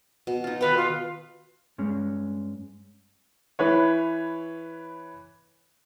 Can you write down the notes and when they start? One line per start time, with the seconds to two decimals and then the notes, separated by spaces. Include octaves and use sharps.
0.27 B2
0.44 D#4 F4
0.61 D#3 B4 F5 G5
0.77 F4
1.78 G2 G#3 C#4
3.59 E3 B4 C#5